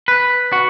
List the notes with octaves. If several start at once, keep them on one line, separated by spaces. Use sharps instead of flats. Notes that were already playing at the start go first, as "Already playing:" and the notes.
B4
F#4